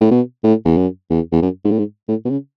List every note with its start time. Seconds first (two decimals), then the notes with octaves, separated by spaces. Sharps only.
0.01 A2
0.11 B2
0.44 A2
0.65 E2
0.77 F#2
1.10 E2
1.32 E2
1.42 F#2
1.65 G#2
1.71 A2
1.79 G#2
2.08 A2
2.25 B2
2.30 C#3